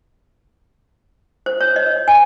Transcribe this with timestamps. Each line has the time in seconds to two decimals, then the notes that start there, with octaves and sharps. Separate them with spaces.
1.46 C5
1.61 C#5
1.76 D#5
2.08 G#5